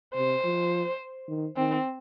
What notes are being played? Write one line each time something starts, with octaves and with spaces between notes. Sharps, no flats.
C3 C5
F3
D#3
D#3 C4